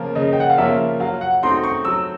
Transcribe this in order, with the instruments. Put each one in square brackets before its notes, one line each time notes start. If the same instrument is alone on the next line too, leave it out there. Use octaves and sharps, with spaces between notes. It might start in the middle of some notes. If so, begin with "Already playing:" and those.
Already playing: [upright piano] C#3 F3 A#3 C#4 F4
[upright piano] C#3 [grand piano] D#5
[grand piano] G5
F#5
F5
[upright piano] F3 A#3 C#4 F4 [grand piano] E5
[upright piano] F#3 [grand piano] F5
[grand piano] F#5
[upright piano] A3 C4 D#4 F#4 [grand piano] C6
[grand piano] C#6
[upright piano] F#3 [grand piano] E6